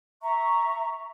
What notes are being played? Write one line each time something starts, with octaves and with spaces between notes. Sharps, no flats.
E5 A#5 C#6